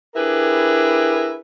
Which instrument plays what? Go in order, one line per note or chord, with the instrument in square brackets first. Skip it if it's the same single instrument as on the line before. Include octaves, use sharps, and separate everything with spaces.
[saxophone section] D4 E4 G4 G#4 A#4 B4